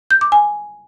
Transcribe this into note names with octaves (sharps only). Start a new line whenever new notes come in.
G6
D6
G#5